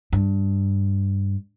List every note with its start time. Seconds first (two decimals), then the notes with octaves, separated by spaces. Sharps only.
0.13 G2